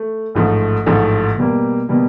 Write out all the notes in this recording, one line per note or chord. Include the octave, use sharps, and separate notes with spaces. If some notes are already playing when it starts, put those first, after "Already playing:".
Already playing: A3
A1 G#2 F3 A3
A1 G#2 F3 A3
B2 G3 A#3
B2 G3 A#3